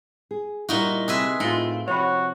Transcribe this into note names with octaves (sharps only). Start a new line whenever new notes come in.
G#4
A#2 G3 D#4 E4 F#4
C3 G#3 G#4 B4 E5
A2 C4 D#4 F4 G#4
C3 F3 F#4 C#5 B5